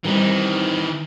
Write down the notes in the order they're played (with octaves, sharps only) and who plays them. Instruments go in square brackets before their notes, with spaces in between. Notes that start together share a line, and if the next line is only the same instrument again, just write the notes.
[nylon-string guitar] D#3 G3 C4 [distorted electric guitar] E3 D#4